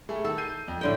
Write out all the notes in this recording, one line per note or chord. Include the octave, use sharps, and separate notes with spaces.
G3 A3 G#4
D#3 A4
G6 C7 D#7
F2
A2 D3 G5